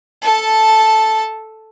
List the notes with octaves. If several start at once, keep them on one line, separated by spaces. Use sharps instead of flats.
A4 A5